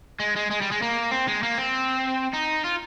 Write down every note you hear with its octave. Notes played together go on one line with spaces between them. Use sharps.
G#3
G#3
G#3
G3
G#3
A#3
C4
G#3
A#3
C4
D#4
F4